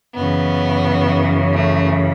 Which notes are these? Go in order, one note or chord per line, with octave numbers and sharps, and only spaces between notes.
F#2 C#3 E3 B3
A3